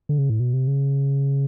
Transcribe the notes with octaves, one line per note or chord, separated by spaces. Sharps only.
D3
C#3
A2
B2
C3
C#3